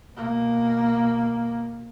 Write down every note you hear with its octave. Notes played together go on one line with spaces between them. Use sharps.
B2 A#3